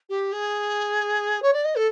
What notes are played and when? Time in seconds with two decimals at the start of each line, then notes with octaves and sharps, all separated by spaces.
0.09 G4
0.32 G#4
1.42 C#5
1.53 D5
1.64 D#5
1.76 A4